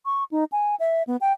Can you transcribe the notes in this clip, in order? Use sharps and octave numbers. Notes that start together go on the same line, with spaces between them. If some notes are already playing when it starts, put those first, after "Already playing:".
C#6
D#4
G#5
E5
B3
G5